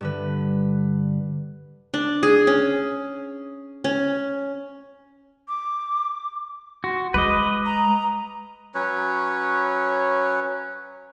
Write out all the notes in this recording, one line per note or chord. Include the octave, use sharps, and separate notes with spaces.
G2 D3 B4
D4
G#4
C#4
C#4
D6
F#4 C6
G#3 B4 D#5 D6
A#5
F#3 C#4 B4 C#5